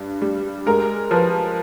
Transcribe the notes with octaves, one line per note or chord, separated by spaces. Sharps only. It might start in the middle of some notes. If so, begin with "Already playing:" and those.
Already playing: G2
G3
G#3 A#4
F3 B4